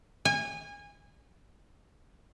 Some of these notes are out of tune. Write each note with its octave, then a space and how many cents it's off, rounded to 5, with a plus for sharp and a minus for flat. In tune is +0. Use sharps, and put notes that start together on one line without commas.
G#5 -25